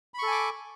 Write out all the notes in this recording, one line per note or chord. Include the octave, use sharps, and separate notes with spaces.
A4 G#5 B5 C#6 D6